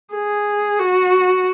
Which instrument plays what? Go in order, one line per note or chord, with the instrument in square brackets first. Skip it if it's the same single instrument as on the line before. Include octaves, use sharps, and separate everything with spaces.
[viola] G#4
F#4